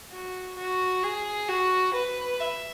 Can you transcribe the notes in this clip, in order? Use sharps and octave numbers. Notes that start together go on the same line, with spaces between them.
F#4
F#4
G#4
F#4
B4
E5